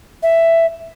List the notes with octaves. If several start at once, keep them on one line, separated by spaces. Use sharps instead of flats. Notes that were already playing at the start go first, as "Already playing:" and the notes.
E5